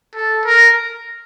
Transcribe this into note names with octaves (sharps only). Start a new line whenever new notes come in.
A4
A#4